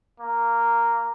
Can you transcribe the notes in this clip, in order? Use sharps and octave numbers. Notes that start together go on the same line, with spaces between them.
A#3